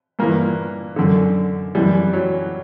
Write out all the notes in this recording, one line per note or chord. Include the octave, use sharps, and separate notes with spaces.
G2 E3 A#3
F#2 D3
F#2 E3 G3
F#3